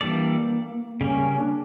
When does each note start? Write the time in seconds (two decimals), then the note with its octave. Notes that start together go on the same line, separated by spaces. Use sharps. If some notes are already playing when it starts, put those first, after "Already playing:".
0.01 E3 G3 A#3 D4 A4 D5
1.01 C#3 G3 A#3 C#4
1.40 D4